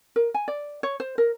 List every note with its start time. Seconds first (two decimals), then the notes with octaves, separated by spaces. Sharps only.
0.16 A#4
0.34 G#5
0.48 D5
0.83 C#5
1.00 C5
1.18 A#4